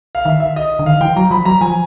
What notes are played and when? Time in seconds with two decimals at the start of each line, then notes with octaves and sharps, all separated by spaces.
0.15 F5
0.25 D#3 E5
0.40 E5
0.56 D#5
0.79 D3
0.85 D#3 F5
1.01 E3 G5
1.17 F#3 A#5
1.31 F3 B5
1.45 F#3 A#5
1.61 F3 G#5